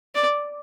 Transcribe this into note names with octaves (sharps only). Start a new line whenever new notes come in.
D5